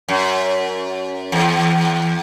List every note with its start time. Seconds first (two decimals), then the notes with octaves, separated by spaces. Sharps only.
0.09 F#2
1.32 E2